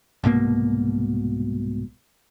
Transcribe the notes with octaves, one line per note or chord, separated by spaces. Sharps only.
C2 G#2 B2 A#3